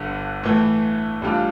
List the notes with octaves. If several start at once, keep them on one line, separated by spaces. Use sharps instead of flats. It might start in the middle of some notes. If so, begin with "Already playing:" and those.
Already playing: G1 G2 D3
A2 E3 A3
A1 A2 G3 D4 F4